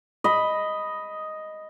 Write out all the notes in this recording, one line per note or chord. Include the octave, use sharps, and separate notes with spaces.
D#5 B5